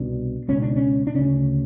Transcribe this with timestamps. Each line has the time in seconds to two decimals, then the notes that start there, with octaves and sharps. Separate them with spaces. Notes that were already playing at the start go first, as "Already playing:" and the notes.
Already playing: C2 B2 D4
0.48 C#2 B2 C#4
0.62 D4
0.76 C#4
1.07 D4
1.15 D2 C#3 C#4